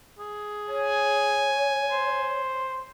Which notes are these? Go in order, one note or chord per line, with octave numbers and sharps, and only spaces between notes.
G#4
C#5 G#5
C5